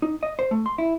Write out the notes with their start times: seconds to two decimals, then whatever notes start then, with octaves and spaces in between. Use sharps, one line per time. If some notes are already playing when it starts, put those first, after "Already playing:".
0.02 D#4
0.23 D#5
0.39 C5
0.51 A3
0.66 C6
0.78 E4